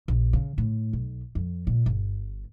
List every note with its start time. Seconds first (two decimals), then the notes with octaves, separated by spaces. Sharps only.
0.08 A#1
0.33 C#3
0.58 A2
0.93 B1
1.35 F2
1.67 A#2
1.86 G1